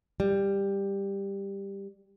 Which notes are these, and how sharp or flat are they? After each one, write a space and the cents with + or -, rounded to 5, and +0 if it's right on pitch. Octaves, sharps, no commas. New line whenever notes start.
G3 +10